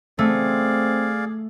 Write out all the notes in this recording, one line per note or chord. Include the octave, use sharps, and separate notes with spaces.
A3 C4 G#4 D5 F5